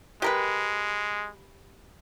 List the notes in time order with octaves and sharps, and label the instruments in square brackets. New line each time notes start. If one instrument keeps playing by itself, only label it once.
[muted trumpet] G#3 [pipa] G4 A#4 B4